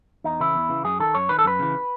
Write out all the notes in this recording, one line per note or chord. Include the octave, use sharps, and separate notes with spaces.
E2 D#4
C#3 E3 E4
E2
C#3 E3
F#2 G#4
D#3 A4
F#2 C#5
D#3 B4
A4
F#2 B4
C#3 E3